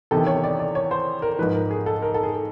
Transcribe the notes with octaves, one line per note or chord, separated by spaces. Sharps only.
E2 C3 D#3 A4
C#5
D5
D5
C#5
C5
A#4
G#2 F3 B4
A#4
G#4
A4
A#4
A4
G#4